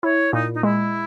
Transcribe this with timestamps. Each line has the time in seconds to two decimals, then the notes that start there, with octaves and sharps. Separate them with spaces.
0.03 E4 C#5
0.33 A#2 D#4
0.54 D#4
0.63 G#3 E4